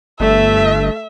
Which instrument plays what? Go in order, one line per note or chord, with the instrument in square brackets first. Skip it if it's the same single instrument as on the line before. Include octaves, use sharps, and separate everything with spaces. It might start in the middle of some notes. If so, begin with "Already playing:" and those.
[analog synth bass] G1 [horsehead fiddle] A3 [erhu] E5